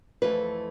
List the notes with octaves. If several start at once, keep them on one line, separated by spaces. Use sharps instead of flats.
F2 E3 A3 B4